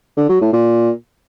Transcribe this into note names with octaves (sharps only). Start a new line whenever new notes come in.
D3
F#3
A2
A#2